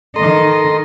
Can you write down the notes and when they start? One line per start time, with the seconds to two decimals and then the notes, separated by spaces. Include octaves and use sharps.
0.16 D#3 A4 D#5 A#5 C6